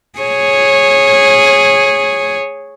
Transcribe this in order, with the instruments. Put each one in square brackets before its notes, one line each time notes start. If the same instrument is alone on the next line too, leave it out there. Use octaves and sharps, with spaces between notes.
[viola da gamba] G#4 C#5